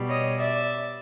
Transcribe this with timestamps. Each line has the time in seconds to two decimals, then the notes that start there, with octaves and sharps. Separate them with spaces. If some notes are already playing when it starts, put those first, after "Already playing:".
Already playing: B2 G3
0.09 C#5 D#5
0.40 D5 E5